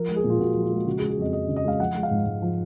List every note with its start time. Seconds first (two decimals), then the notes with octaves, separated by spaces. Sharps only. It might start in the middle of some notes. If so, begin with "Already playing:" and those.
Already playing: F3 A#4
0.09 G#3
0.16 G#4
0.24 A#2
0.30 F4
0.39 A#2 F#4
0.51 F3 F#4
0.63 F4
0.70 G#3 F#4
0.86 C#3 F#4
0.98 G#4
1.02 G#3
1.10 G#4
1.18 F2 D#5
1.33 F2 D#5
1.48 C#3
1.56 D#5
1.64 G#3 F5
1.79 F3 F#5
1.95 G#3
2.03 F5
2.11 G#2
2.26 G#2
2.42 F3